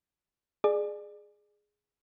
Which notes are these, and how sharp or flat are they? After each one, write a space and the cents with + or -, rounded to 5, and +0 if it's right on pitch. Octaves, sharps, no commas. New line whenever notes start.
G#4 +5 D5 +30